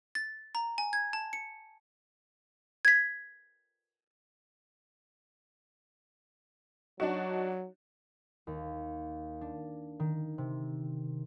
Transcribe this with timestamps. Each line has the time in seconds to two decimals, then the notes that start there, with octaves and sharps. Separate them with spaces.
0.15 A6
0.55 A#5
0.78 G#5
0.93 G#6
1.13 A5
1.33 C#7
2.85 G#6 B6
7.00 F#3 D4 D#4 F#4
8.47 D#2
9.41 D4
10.00 D#3
10.38 C3